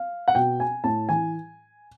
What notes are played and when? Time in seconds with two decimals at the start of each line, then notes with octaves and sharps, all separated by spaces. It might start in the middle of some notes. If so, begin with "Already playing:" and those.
Already playing: F5
0.28 F#5
0.35 B2 G5
0.60 G#5
0.84 A2 A5
1.09 E3 G#5